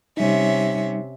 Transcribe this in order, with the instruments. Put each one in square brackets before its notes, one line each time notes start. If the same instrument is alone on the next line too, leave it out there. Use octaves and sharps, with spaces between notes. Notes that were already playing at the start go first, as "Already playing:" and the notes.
[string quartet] C3 C#4 E5 [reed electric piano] G3 D#4